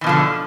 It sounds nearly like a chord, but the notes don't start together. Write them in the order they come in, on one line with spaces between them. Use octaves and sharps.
E3 B2 F3 D3